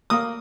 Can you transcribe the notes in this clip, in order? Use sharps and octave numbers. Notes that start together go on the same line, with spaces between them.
A#3 D#6